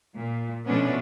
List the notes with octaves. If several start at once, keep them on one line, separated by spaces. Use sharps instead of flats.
A#2
B2 F3 A3 B3 C#4 D4